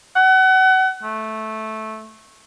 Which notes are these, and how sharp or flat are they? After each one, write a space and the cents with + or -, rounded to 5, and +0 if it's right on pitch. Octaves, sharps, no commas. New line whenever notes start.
F#5 +30
A3 -10